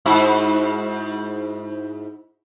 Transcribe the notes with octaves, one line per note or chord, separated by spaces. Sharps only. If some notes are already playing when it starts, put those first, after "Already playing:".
G#2 E4 F#4